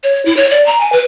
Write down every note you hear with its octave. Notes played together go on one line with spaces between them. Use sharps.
C#5
E4
C#5
D5
A#5
G#5
B4